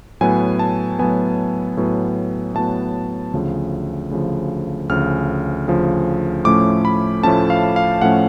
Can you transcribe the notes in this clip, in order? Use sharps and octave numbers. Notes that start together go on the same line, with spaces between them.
A2 F#3 B3 G#5
A5
A2 F#3 B3 G#5
A2 F#3 B3
A2 F#3 B3 A5
D2 C#3 F3
D2 C#3 F3
D2 C#3 F3 F6
D2 C#3 F3
A2 F3 A3 C#4 D6
B5
A2 F3 A3 C#4 A5
F5
F5
A2 F3 A3 C#4 F#5